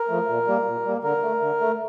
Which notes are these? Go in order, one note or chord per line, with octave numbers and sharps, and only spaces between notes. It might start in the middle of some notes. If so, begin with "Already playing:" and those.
Already playing: A#4
F3 A3
A#2
G3 A#3
A#2
G3 A#3
D3 A#4
A3
D3
A3